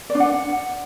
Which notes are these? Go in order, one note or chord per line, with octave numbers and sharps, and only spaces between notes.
D5
D4
F#5